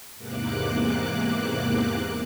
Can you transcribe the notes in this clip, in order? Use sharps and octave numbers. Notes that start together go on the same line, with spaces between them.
E2 G#2 C3 A#3 D6 F#6